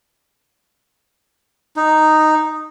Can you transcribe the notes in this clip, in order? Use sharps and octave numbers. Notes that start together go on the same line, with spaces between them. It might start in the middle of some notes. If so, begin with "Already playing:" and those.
D#4